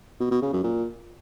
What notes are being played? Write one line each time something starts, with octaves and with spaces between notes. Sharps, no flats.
B2
B2
C#3
F#2
A#2